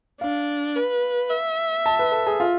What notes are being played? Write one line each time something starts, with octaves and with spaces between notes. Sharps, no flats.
D4 F5
B4
E5
A5
B4
A4
G#4
F4